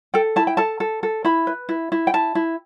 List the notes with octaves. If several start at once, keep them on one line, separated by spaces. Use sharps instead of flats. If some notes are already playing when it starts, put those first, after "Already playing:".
A4 G5
E4 A5
G5
A4 A5
A4
A4
E4 B5
B4
E4
E4
G5
E4 A5
E4